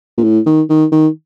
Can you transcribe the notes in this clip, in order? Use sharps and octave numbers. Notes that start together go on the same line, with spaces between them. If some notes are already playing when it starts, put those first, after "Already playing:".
A#2
A2
D#3
D#3
D#3